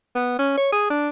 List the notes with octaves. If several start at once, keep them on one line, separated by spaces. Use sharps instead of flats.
B3
C#4
C#5
G#4
D4